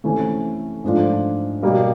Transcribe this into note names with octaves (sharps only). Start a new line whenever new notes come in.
C3 E3 A3 C#4
G#2 F3 A3 D4 F4
B2 G3 A#3